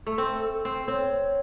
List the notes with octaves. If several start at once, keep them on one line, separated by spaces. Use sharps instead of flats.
A3
C4 A4
A4
C4
C4 C#5